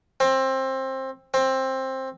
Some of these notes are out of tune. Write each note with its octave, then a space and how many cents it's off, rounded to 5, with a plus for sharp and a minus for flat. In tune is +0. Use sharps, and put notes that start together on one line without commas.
C4 +20
C4 +15